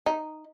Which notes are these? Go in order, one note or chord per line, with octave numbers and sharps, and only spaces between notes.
D#4